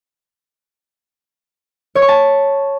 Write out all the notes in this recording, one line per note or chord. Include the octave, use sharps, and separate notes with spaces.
C#5
C#6
A5